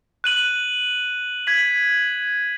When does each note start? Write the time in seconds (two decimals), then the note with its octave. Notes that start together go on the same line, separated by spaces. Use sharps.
0.24 F#6 D#7 F#7
1.47 G#6 B6 F#7